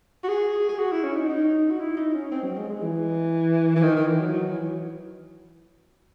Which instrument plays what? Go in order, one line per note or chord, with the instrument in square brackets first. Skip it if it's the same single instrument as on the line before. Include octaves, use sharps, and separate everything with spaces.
[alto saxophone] F#4
G#4
G#4
F#4
E4
C#4
D#4
D#4
F#4
E4
D#4
C#4
C4
F#3
G#3
G#3
E3
E3
D#3
D#3
E3
F#3
F#3
E3